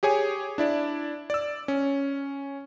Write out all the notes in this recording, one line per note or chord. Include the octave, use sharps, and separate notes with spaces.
G4 G#4 C#5 G#5 D#6
D4 E4 D5
D5 E6
C#4